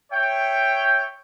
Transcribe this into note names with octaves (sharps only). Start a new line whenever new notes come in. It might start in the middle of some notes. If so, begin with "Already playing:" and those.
C#5 E5 G5